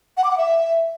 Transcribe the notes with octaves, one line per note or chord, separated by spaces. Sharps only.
F#5
D6
F#5
E5